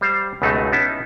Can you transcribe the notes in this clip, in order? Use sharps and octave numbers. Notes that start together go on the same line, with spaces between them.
G3 C5 F5
C#2 F#2 B2 F#3 A3 D#4
B3 C#4 D#4 E4 A5